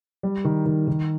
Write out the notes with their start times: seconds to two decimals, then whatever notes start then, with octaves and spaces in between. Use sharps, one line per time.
0.23 G3
0.45 D#3
0.66 D#3
0.88 D#3